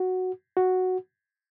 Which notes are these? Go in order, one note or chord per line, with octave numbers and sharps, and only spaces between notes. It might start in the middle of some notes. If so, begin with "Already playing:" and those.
Already playing: F#4
F#4